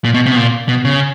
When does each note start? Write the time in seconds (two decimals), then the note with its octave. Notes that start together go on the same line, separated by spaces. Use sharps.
0.05 A#2
0.14 B2
0.26 C3
0.32 B2
0.36 A#2
0.69 B2
0.85 C#3